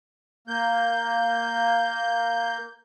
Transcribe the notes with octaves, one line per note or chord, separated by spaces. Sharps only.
A#3 G6